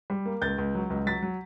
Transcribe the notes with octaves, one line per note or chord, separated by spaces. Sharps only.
G3
A#3
C#2 G6 A6
C#2
F#3
C#2
F#3 A6 B6
F#3